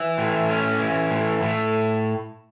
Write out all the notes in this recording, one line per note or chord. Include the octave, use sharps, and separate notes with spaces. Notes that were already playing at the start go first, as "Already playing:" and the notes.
Already playing: E3
A2
C#4
E3
A2
A2